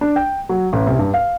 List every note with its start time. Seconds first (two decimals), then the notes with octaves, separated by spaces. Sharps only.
0.01 D4
0.16 G5
0.49 F#3
0.73 A1
0.87 C2
0.99 G2
1.14 F5